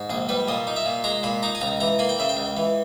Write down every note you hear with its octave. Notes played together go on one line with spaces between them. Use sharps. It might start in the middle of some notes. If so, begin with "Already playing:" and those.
Already playing: G#2
A#1 G#4
G3 B4
A#2 D#5
D#4
E5
A#2
G#3 A#5
A#2 B5
D#4 A#5
G#5
C#2 A#5
E3 A#5
A#3 G#5
G5
C#3 E5
G5
C#2
E3